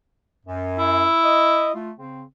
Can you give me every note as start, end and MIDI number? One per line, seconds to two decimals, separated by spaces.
0.46 1.06 42
0.79 1.75 64
1.24 1.73 75
1.74 1.91 57
1.74 1.91 65
1.97 2.22 49
1.97 2.22 60